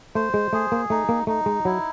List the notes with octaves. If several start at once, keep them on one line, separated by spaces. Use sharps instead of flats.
A3 C5
G#3
A3 G#4
A#3
A3 D#4
A#3
A3 D#4
G#3
F#3 E4